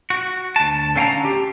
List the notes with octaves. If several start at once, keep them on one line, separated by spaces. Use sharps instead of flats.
F#4
D2 A5
D3 C#4 F5 G5 A5 A#5
G4